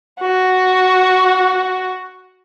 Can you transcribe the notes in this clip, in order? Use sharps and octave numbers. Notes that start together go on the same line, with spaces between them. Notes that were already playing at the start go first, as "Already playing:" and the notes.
F#4